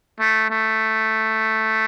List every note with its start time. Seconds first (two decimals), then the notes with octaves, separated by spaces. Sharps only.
0.20 A3
0.50 A3